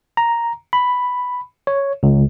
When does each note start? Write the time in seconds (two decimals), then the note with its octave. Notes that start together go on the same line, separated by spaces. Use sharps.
0.17 A#5
0.73 B5
1.67 C#5
2.03 C#2